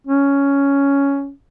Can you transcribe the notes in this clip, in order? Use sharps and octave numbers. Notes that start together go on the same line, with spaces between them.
C#4